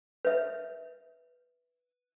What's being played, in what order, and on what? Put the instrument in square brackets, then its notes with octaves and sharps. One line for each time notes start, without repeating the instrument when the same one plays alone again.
[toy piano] B4 E5